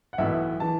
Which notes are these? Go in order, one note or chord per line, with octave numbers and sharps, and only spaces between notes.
F#5
B1 A2 E3 B3 E5
E3 A5